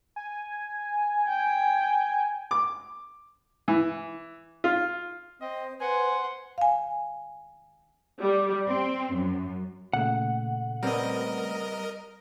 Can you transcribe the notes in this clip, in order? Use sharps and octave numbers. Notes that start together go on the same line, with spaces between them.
G#5
G5
D6
E3
F4
C4 C5 D#5
B4 C5 F#5 G#5 C6
F5 G#5
G3
C4
F#2
A#2 C#3 A3 F#5
G3 B3 C4 A#4 D#5